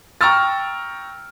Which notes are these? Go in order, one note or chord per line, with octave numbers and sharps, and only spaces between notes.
G5 A#5 C#6 E6 F6 A6